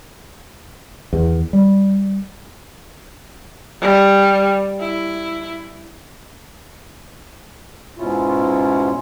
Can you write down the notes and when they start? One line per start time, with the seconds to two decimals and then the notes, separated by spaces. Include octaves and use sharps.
1.13 E2
1.53 G3
3.81 G3
4.80 E4
7.98 G#2 B2 C#4 E4 F4